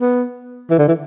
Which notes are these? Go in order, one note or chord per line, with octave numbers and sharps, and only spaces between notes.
B3
E3
D3
E3